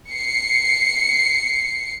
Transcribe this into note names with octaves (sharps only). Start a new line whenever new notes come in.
C7 C#7